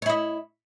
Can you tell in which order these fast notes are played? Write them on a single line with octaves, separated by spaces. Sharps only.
C#5 E4 D#5